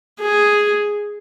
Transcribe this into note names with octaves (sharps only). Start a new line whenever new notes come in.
G#4